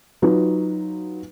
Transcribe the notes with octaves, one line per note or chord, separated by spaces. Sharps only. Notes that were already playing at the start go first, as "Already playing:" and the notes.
F#3 D#4 F4 B4